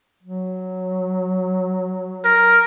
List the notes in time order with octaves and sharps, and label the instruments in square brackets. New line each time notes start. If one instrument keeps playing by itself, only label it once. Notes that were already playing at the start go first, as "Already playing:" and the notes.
[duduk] F#3
[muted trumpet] A#4